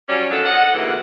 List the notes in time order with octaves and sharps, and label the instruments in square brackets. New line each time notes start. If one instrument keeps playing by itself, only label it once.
[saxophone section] F#3 G3 C#4
D#3 F3 F#3 D4 A4
D#5 F#5
D2 G#2 C3 E3 A#3